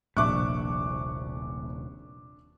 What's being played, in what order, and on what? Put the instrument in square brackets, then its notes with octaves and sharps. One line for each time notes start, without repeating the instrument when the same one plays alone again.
[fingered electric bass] D#1 C3 [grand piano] A#1 [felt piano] D4 E5 F#6 [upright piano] C#6 D6